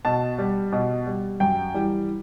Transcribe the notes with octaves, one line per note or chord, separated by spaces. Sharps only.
B2 A5
G3
B2
G3
F#2 G5
E3 G3